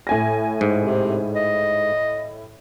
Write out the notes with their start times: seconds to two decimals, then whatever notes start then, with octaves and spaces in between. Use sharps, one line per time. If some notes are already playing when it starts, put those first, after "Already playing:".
0.07 A2 G#5 A#6
0.61 G#2
0.82 C3
1.35 D#5